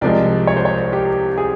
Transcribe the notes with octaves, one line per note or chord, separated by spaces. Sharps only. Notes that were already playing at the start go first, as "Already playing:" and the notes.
C2 C3 F3 G#3 D5
C#5
C5
C#5
G4
G#4